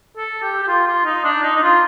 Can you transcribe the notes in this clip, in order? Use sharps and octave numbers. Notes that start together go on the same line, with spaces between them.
A4
G4
G4
F4
F4
D#4
D4
D#4
D#4
F4